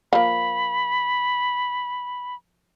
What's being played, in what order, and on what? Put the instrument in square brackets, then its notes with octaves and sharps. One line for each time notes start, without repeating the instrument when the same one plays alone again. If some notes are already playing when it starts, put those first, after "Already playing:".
[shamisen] F3 A#3 [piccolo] B5